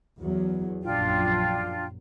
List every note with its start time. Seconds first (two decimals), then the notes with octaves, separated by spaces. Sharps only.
0.18 E2 F#3
0.83 A#1 F#2 D4 F4 G5